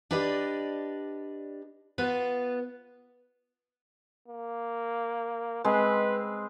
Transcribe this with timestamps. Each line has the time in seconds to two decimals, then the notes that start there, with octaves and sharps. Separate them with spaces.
0.11 D4 G4 B4 D5 D#5
1.98 B3 F4 B4
4.28 A#3
5.65 G#3 C4 B4